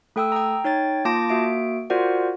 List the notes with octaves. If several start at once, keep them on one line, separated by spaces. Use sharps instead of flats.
A3 A4 G5 D#6 E6
G5 A#5
D#4 C#5 G5 A6
A#3 F4 A5 D6 A#6 D7
A#3 F#4 E5 D7
F4 F#4 A#4 C5 D5 F#5